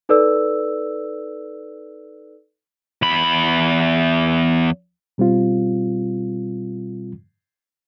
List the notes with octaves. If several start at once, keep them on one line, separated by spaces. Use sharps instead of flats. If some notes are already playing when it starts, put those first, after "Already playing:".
D#4 A4 B4 D5 E6
E2 B5
B2 G3 C4 F4